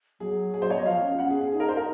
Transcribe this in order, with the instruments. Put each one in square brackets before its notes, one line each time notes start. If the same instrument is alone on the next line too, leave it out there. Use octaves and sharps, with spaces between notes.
[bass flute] F#3 [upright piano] G#4
[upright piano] G#4
C5
C#5
D#5
[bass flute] F3 [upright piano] F5
[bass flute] C#4
[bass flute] C#4 [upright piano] F#5
[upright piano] G#4
G#4
[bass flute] D#4 [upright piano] G#4
[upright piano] A#4
C5
A#4